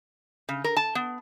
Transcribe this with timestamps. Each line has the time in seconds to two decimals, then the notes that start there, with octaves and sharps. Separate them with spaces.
0.49 C#3
0.64 A#4
0.77 A5
0.95 B3